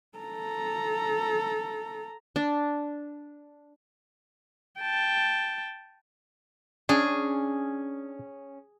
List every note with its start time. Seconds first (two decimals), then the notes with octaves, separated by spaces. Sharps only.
0.18 A4 A#5
2.36 D4
4.81 G5 A5
6.89 C#4 D4 G#4